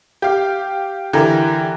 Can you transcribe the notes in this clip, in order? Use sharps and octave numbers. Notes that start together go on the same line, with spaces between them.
G4 F5
D3 E3 G4 A#4